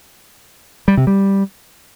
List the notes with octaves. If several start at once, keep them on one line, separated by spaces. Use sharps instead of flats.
G3
C3
G3